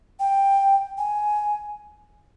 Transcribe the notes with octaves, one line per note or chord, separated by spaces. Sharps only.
G5
G#5